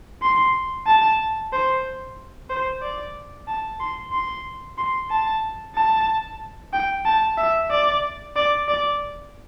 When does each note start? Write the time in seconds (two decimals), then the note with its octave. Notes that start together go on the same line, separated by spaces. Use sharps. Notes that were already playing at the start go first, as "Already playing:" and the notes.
0.22 C6
0.87 A5
1.53 C5
2.50 C5
2.82 D5
3.48 A5
3.80 C6
4.12 C6
4.78 C6
5.11 A5
5.76 A5
6.73 G5
7.05 A5
7.38 E5
7.71 D5
8.36 D5
8.68 D5